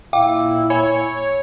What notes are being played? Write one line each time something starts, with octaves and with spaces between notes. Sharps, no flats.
A#2 E4 F5 G5 D6
C#5 G#5 B5